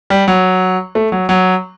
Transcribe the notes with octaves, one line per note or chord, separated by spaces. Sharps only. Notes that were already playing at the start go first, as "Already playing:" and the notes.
G3
F#3
A3
F#3
F#3